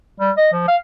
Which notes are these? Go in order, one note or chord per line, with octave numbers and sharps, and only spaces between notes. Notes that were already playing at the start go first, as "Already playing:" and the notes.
G3
D#5
F3
F5